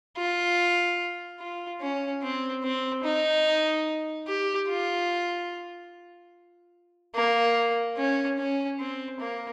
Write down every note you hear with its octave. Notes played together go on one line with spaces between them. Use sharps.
F4
F4
C#4
C4
C4
D#4
G4
F4
A#3
C#4
C#4
C4
A#3